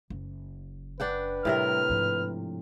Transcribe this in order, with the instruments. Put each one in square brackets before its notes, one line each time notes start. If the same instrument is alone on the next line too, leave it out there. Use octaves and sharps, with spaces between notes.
[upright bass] F#1
[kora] D4 F#5 G5 [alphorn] B4
[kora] A2 C3 A#4 [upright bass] G3 [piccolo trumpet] F6
[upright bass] G#2 F3